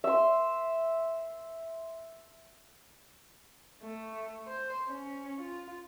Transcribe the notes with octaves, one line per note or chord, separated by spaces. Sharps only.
E5 C6
A3
C5
C#4
F4